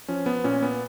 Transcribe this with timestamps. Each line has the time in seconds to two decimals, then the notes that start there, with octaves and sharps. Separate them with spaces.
0.08 F3 C#4
0.26 B3
0.44 A#2 C#4
0.62 B3